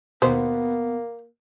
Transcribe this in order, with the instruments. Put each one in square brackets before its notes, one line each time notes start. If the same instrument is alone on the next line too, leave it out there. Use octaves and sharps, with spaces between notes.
[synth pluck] D#2 B2 [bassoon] A#3 [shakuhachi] B3 [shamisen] C5